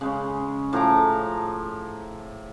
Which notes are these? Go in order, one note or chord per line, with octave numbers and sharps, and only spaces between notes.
C#3 G#3 C#4
A2 F3 A#5 D6